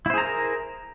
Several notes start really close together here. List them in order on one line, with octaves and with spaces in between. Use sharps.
E4 C5 G#4 A#5 A#4